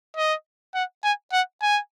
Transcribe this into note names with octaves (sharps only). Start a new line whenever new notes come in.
D#5
F#5
G#5
F#5
G#5